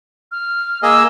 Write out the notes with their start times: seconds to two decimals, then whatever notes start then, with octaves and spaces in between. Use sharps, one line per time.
0.32 F6
0.83 A#3 G#4 D#5 E6